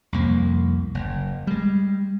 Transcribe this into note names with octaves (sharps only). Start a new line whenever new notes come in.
C2 F2 A#3
F#1
G3 G#3